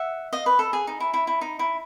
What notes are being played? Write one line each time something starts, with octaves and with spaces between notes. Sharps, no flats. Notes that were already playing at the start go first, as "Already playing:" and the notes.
Already playing: E5 F#5
D#5 F5
B4
A4
G#4
D#4
E4
E4
E4
D#4
E4